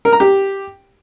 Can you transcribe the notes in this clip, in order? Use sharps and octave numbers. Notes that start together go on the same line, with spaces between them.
A#4
A#5
G4